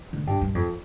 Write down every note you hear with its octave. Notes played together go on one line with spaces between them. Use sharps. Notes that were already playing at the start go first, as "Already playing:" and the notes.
D3
G2
G2
F2